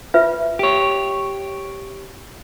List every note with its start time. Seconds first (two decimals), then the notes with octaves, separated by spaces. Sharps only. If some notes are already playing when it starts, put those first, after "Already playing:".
0.14 F4 B4 E5
0.59 G4 C#5